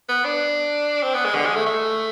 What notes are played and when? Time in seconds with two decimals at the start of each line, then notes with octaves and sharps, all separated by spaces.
0.09 B3
0.25 D4
1.03 C4
1.14 B3
1.25 G#3
1.35 D3
1.46 G#3
1.55 A3
1.66 A3